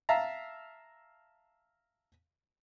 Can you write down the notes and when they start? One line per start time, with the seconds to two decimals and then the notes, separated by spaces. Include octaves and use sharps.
0.09 E5 F5 A5 A#5